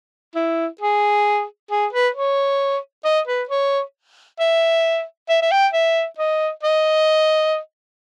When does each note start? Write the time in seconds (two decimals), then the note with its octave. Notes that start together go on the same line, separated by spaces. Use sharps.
0.35 E4
0.81 G#4
1.71 G#4
1.93 B4
2.15 C#5
3.04 D#5
3.27 B4
3.49 C#5
4.40 E5
5.29 E5
5.42 E5
5.52 G5
5.73 E5
6.18 D#5
6.63 D#5